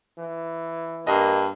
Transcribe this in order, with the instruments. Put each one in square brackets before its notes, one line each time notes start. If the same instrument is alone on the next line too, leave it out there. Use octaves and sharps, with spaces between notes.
[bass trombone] E3
[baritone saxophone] G2 [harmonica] A#3 [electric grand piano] D#5